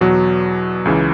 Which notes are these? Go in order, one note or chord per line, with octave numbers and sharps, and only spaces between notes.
E2 B2 F#3
C#2 C#3 E3